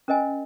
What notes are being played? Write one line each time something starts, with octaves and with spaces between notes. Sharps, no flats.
C#4 A#4 D#5 G#5